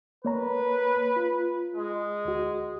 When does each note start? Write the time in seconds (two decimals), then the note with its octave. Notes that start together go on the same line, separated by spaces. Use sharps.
0.25 A#3 B4 C#5 A#5
1.16 F4
1.75 G#3
2.25 D2 F#4